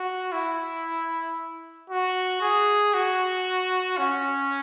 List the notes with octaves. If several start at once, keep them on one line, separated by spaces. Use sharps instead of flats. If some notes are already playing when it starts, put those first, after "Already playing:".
Already playing: F#4
E4
F#4
G#4
F#4
C#4